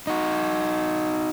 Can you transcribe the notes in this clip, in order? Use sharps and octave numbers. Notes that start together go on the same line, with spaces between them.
D#4 F#4